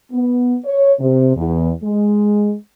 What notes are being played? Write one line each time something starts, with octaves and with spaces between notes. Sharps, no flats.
B3
C#5
C3
E2
G#3